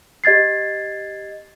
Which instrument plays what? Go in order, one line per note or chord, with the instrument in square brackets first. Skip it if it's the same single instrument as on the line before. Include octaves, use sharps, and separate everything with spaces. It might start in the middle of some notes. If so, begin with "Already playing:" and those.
[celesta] G4 D#5 G#6 A6 C7